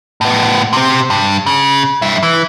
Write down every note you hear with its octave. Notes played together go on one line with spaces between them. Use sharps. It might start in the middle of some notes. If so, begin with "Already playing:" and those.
A2 B3
C3 C4
G2
C#3
G2 E5
E3